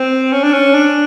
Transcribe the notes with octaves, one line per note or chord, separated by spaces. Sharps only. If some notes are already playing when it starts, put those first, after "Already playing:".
Already playing: C4
C#4
D4
C#4
D4